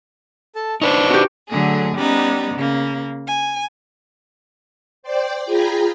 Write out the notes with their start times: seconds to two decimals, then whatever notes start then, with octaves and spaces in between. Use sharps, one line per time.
0.56 A4 A5
0.82 D4 D#4 B4 C5 C#6
1.10 F#4 G4
1.48 D3 F#3 A3 G#4
1.95 G3 B3 C#4 D#4 D5
2.54 C#3 A#3
3.27 G#5
5.03 C5 D5 G5
5.45 F4 G#4 G5 G#5 A#5 B5